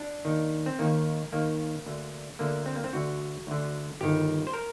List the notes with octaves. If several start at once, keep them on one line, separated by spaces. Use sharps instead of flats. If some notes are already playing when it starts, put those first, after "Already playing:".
Already playing: D4
D#2 D#3
C4
D#2 D#3 A#3
D#2 D#3 A#3
D2 D3
D2 D3 A#3
C4
A#3
C4
D2 D3 F#4
D2 D3
G1 G2 D#3 G4
C5
A#4